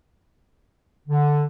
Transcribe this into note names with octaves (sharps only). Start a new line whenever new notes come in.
D3